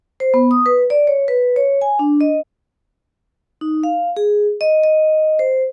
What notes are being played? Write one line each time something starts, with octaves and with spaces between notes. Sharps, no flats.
C5
B3
D#6
B4
D5
C#5
B4
C#5
G#5
D4
D#5
D#4
F5
G#4
D#5
D#5
C5